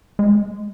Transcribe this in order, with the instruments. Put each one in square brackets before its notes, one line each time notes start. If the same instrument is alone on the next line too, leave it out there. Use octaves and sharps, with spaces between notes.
[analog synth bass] G#3